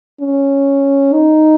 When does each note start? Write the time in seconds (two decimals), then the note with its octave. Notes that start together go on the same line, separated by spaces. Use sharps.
0.20 C#4
1.13 D#4